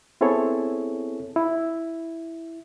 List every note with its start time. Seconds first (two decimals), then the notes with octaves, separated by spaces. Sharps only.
0.21 B3 C4 E4 G#4 A4 C#5
1.36 E4